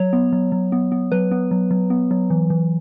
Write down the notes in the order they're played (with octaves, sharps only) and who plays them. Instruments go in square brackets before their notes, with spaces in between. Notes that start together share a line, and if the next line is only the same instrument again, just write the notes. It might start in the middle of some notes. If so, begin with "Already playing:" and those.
Already playing: [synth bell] F#3 C#5
B3
F#3
F#3
B3
B3
F#3 B4
B3
F#3
F#3
B3
F#3
E3
E3